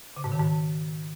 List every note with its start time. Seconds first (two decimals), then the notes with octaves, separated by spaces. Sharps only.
0.16 C#3
0.24 G#2
0.32 D#3
0.39 G#2